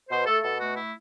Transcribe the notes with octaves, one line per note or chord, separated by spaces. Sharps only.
B2 C5
A3 A4
B2 A4
A3 F#4
E4